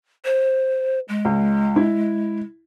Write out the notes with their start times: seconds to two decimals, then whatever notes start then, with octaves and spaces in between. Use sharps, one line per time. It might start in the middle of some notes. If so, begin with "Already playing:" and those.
0.25 C5
1.09 G#3
1.25 C#2
1.76 E4